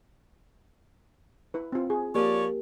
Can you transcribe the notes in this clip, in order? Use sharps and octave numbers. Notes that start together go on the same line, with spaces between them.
E4 B4
C4 F4
G#4
F3 A#3 G4 A#4 C#5 D5